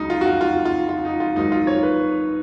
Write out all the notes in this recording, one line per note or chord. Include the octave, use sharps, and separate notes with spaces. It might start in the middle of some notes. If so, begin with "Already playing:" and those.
Already playing: C#2 C#3 F#3 D#4
F4
F#4
F4
F4
F4
F4
D#4
F4
G#1 G#2 F#3 A#3 D#4
F4
C#5
B4